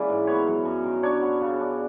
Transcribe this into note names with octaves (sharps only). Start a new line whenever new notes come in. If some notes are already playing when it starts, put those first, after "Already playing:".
Already playing: E3 G#3 A#3 C#4 D5 E5
G#2
B3 C#5
F#2
F#2
D#3
D4 C#5
B3
C#3
D4